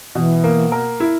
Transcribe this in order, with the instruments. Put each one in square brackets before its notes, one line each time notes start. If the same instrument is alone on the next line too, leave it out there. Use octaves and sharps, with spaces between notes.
[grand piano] B2 [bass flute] E3
[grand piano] A#3
A#4
E4